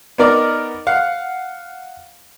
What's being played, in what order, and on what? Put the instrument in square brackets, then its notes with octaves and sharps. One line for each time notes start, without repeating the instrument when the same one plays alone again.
[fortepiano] B3 D#4 A#4 D5
F5 F#5